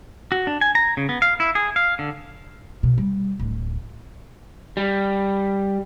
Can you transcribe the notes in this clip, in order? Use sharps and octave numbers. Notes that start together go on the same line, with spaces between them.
F#4
D4
G#5
A#5
C#3
B3
F5
E4
G#4
F5
D3
B2
G3
D1
G3